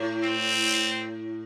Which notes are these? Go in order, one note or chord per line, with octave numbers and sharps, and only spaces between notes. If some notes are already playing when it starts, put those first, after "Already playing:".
Already playing: A2
C4